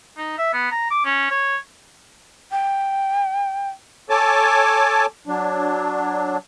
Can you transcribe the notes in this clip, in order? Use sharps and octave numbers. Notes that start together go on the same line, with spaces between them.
D#4
E5
B3
A#5
D6
C#4
C#5
G5
A4 C#5 G#5 A5 D6
F#3 D4